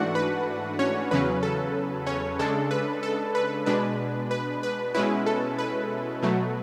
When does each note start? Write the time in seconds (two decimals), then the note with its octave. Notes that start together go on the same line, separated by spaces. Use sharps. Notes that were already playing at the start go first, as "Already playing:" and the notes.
Already playing: G#2 E3 A3 D4 F#4 F#5
0.15 B4
0.79 C#4 C#5
1.11 E2 C#3 F#3 C#4 B4
1.43 A4
2.06 C#4 C#5
2.39 C#3 G#3 D4 A4
2.71 B4
3.03 A4
3.35 B4
3.66 B2 G#3 D4 B4
4.31 B4
4.63 B4
4.94 B2 G#3 C#4 E4 B4
5.26 A4
5.58 B4
6.22 B2 F#3 A3